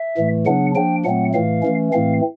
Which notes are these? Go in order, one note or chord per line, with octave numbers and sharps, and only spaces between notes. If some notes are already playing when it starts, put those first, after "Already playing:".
Already playing: E5
A2 E3 A3
C#3 F#3 B3 D4 F#5
F3 A#3 D4 G5
A#2 F#3 A3 C4 F#5
A2 E3 A3 F5
E3 A3 C#4
A2 E3 A3 C4 F5